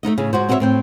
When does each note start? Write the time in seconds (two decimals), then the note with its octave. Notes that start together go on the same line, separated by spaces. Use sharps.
0.03 A3 D4 D#4 D#5
0.18 A2 C#3 G#4
0.33 G#2 F#4 C5
0.49 C4 F#4 G#4 B4 C#5 E5
0.60 A2 C4 G5